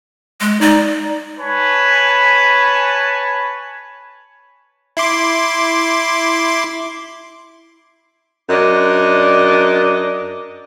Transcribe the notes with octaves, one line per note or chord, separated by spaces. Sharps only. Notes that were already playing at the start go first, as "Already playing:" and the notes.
G#3
D#4 D5
B4 C#5 G#5 A5 B5
E4 C6 D6
F#2 D4 D#5